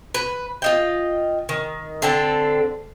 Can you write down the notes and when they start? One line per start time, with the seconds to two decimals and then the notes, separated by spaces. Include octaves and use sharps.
0.14 B4
0.62 F4 D#5 G5
1.49 D#3
2.02 D3 C4 A4